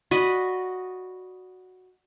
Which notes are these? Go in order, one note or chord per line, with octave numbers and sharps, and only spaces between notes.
F#4 D5 D#5 B5